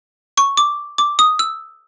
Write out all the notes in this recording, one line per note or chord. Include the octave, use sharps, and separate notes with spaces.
C#6
D6
D6
D#6
E6